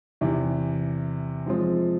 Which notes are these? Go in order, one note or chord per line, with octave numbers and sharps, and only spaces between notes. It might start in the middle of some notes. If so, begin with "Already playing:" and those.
E2 C3 E3
F3 G#3 C4 F4